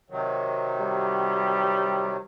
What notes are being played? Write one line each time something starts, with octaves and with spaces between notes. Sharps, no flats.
C3 D#3 F#3
G3